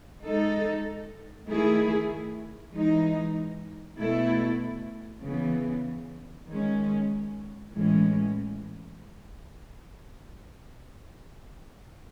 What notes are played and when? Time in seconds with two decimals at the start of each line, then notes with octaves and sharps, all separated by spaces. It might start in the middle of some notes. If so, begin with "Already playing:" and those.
0.22 G#3 D#4 A4
1.46 D#3 A3 E4 G#4
2.72 E3 G#3 D#4
3.97 B2 A3 E4 A4
5.22 C#3 E3 B3
6.47 D#3 G#3 C#4
7.72 A2 E3 G#3 C#4